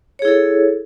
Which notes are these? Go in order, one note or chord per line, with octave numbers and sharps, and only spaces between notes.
E4 G#4 A4 C#5